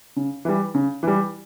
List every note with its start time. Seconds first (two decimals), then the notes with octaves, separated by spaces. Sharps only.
0.16 C#3
0.45 E3 G3
0.75 C#3
1.03 E3 G3